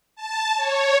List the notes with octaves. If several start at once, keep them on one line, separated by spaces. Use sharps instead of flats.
A5
C#5